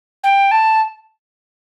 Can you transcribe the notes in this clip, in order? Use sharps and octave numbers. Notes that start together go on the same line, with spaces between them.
G5
A5